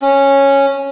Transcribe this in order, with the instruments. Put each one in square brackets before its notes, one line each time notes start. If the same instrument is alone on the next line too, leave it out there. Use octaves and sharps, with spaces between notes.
[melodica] C#4